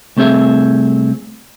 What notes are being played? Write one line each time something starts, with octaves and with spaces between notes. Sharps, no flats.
C2 A3 C4 G#4 E5